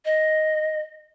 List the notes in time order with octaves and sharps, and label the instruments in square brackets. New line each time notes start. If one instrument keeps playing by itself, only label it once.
[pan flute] D#5